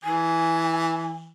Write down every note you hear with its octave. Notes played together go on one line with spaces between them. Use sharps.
E3 G#5